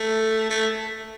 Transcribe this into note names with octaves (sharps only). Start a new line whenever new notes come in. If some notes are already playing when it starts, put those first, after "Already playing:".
Already playing: A3
A3